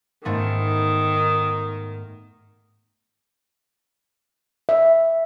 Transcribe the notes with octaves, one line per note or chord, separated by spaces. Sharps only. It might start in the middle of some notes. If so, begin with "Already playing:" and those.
G#2 D#3 A3 B3
E5